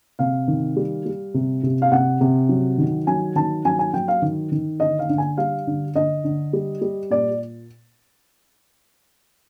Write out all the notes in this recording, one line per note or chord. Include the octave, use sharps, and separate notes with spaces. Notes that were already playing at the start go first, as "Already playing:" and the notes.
C3 F5
D#3
G3
G3
C3
C3
F5
C3 F#5
C3
F#3
D#3
F#3 G#5
D#3 A5
F#3 G#5
G#5
F#3 G5
F5
D#3
D#3
D3 D#5
F5
D3
G#5
G3 F5
D3
D3 D#5
D3
G3
G3
A#2 D5